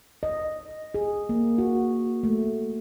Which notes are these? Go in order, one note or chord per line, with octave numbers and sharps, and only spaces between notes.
D#5
G#4
A#3
F#4
A3